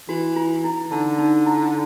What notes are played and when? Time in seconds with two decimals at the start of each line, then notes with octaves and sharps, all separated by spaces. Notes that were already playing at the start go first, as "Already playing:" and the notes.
0.09 E3 F#4
0.36 F4
0.64 E4
0.85 E4
0.91 D3 D#4
1.19 D#4
1.46 E4